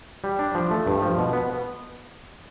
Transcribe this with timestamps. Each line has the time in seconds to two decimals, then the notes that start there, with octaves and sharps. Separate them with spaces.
0.24 G3
0.39 D4
0.55 F3
0.71 A3
0.86 G2
1.02 F3
1.18 B2
1.33 B3